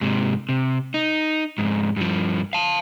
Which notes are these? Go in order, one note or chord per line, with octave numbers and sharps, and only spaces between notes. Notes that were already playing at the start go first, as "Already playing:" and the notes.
G#2 C3
C3
D#4
F2 G#2
G2 F3
F5 A5